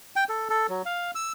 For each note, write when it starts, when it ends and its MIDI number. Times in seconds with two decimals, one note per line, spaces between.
0.16 0.24 79
0.29 0.49 69
0.50 0.67 69
0.69 0.82 54
0.85 1.11 77
1.15 1.33 88